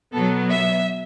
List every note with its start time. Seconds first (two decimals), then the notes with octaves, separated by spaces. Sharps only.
0.13 B2 F#3 B3 A4
0.49 E5